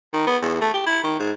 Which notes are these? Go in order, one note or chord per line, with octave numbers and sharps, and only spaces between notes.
D#3
B3
E2
A3
G4
E4
D#3
G#2